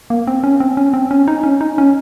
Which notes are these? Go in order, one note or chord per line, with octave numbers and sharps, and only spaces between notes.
A#3
C4
C#4
C4
C#4
C4
C#4
D#4
C#4
D#4
C#4